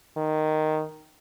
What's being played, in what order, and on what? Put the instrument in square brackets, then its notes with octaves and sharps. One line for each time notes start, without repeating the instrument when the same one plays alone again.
[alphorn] D#3